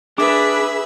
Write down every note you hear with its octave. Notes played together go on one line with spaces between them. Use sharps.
D4 G#4 B4 E5 D6